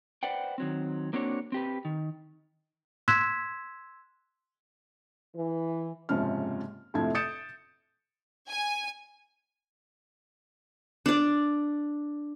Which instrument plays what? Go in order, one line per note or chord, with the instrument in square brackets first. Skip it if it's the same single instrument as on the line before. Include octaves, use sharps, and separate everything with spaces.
[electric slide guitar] B4 C5 D5 F#5 G5
D#3 F#3 C4
A#3 C4 D4 F#4 C#5
C4 G4 B4
D#3
[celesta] C6 E6 F#6 G#6 B6 E7
[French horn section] E3
[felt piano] F#1 G#2 C3 F3 C#4 F6
F2 A2 C3 F3 E4 G#6
D#6 G6 A6 C#7 D7 E7
[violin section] G#5
[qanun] D4 D5